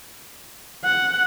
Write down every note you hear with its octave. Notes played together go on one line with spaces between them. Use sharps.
F#5